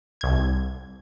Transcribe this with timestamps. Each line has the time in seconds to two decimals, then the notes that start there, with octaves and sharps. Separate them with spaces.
0.21 C2 G#6